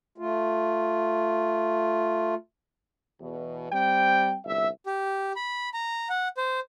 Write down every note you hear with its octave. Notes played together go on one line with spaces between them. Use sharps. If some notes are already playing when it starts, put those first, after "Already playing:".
A3 F4
E2 B2
G3 C4 G5
G1 C2 E5
G4
B5
A#5
F#5
C5